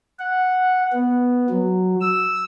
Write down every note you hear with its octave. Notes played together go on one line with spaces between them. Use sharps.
F#5
B3
F#3
E6